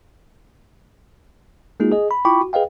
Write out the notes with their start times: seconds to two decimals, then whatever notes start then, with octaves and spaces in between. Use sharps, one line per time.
1.80 G#3 A#3 D#4 F4 F#4 G#4
1.92 G#4 D#5
2.11 B5
2.25 E4 F4 G5 B5 C#6 D6
2.41 F#4
2.53 G#4 B4 D#5 F5 G5